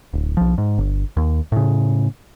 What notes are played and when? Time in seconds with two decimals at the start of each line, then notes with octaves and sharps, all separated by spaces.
0.13 D1
0.37 B1 F3
0.58 G#2
0.78 G1
1.17 D#2
1.52 A2 C#3